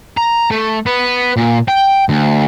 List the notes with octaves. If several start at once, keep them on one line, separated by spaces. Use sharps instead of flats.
A#5
A3
B3
A#2
G5
D2